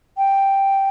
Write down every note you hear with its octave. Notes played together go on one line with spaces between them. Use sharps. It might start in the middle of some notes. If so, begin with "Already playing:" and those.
G5